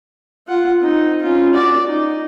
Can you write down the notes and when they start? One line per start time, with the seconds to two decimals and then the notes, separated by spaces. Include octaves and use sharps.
0.48 F4 F#5
0.80 C4 D#4
1.22 C#4 F4
1.54 F#4 D5
1.87 D#4